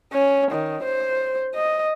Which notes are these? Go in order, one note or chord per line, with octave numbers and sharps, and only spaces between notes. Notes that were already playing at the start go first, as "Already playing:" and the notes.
C#4
D#3
C5
D#5